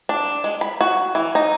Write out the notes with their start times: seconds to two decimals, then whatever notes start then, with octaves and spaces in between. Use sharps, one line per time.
0.09 D4
0.44 G#3
0.61 B5
0.81 F#4
1.15 E3
1.35 D#4